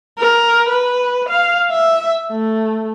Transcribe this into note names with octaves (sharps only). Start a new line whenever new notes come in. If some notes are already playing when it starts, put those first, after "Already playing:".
A#4
B4
F5
E5
A3